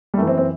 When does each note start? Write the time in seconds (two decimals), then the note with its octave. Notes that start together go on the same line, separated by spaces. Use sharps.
0.14 G3
0.17 F#2 E3 A3
0.27 C4
0.38 C4